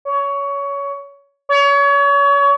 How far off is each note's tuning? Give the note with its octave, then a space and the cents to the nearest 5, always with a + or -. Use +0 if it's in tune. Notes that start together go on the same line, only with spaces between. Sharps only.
C#5 +20
C#5 +30